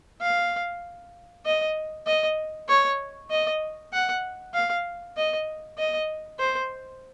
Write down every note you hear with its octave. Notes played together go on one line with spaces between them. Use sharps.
F5
D#5
D#5
C#5
D#5
F#5
F5
D#5
D#5
C5